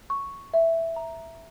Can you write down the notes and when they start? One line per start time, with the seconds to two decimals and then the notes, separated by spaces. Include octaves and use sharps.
0.10 C#6
0.54 E5
0.96 A#5